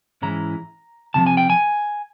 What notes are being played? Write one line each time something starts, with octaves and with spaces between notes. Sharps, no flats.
G#2 E3 G#3 C#4 E4 A#5
C#2 C3 F3 A5
G#5
G5
G#5